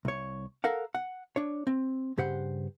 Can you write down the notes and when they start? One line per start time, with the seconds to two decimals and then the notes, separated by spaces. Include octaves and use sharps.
0.05 C2 C#5
0.64 A4 A#4 F5 F#5
0.95 F#5
1.36 D4 C#5
1.67 C4
2.18 G2 C#3 G4 C5 F#5